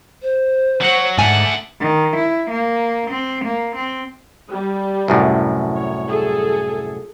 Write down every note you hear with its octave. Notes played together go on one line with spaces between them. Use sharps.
C5
F#3 F#4 F#5
G#2 A3 D4 F#5 G#5
D#3
E4
A#3
C4
A#3
C4
G3
C2 F#2 A2
C#5
G#4 A4